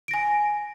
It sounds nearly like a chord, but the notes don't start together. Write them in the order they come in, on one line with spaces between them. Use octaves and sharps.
D7 A#6 G#5